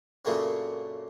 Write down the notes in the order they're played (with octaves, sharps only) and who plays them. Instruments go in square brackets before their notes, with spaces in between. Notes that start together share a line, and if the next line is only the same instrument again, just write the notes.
[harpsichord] F#2 A#2 C#3 A3 A#3 C4